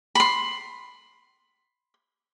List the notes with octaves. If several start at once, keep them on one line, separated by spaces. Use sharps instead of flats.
B5 C6